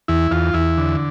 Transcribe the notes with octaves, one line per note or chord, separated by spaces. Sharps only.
E2 E4
E2 F4
E2 E4
D3